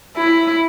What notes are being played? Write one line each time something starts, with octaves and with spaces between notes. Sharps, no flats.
E4